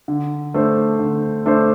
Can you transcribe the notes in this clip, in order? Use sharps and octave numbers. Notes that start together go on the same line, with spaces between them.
D3
A3 D4 C5
D3
A3 D4 C5